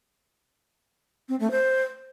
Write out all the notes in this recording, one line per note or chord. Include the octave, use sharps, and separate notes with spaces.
C4
A3
C5